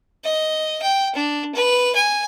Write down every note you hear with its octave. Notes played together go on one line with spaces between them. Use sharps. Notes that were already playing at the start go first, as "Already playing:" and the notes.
D#5
G5
D4
B4
G#5